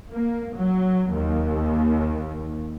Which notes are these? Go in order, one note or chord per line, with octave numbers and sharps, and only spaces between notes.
A#3
F#3
D#2